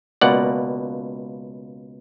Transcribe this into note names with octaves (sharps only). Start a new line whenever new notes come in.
C#2 B2 A#3 D5 F#5